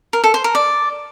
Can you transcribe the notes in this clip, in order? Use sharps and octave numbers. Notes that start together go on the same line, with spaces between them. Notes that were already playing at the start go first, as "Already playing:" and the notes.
A#4
A4
C5
A#4
D5